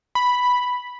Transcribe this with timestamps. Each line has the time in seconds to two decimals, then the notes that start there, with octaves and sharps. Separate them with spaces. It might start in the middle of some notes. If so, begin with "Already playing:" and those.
0.15 B5